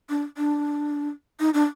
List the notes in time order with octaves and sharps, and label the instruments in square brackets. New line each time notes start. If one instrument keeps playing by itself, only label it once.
[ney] D4
D4
D#4
D4